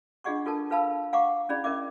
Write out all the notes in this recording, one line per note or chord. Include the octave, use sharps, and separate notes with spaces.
D4 F4 G#4 D#5 F#5 C#6
F4 A4 A#4 A5
F4 B4 F5 A5 B5 E6
F5 F#5 A#5 C#6 D6
C#4 E4 G#4 D5 B5
C#4 A#4 D#5 E5 D6